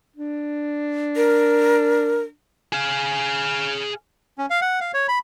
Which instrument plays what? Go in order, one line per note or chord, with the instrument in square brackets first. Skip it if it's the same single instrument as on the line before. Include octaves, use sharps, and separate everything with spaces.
[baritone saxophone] D4
[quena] A#4
[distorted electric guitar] G#4 F5
[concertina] C#4
F5
F#5
F5
C#5
B5